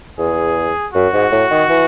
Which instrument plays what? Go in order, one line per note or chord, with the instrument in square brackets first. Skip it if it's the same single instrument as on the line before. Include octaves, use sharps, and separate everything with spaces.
[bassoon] E2 [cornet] G#4
[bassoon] F#2 [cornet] F#4
[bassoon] G#2
A2
D#3
E3